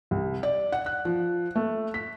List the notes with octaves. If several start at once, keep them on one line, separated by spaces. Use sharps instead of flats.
C2
D5
F#5
F#6
F3
A3
B6